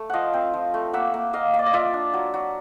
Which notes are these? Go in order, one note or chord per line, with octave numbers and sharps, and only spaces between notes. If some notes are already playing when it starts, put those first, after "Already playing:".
Already playing: A3
F3 D#5 F5 F#5
C4
F3
A3
A#3 E5 F#5
A#3
A#3 D#5 F5
A#3
D5
D#5
F4 D5 E5
D4
F#3
F#3